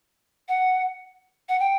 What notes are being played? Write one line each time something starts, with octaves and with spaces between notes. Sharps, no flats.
F#5
F#5
G5